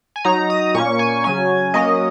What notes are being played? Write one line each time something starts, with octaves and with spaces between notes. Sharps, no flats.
G#5
F#3 D#4 A#5
D#6
A#2 A#3 C#4 C#6
G#5
C#3 F#3 C#4 G#5
F#3 A#3 C#4 D#5